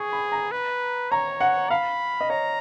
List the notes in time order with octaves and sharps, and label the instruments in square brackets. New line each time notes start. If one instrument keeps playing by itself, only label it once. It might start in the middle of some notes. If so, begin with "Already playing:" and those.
Already playing: [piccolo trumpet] G#4 [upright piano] C#6
[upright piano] B5
A#5
[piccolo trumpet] B4
[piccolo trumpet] C#5 [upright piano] A#5
[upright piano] F#5
[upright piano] F5 [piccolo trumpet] B5
[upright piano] D#5
[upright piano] C#5 [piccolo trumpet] A#5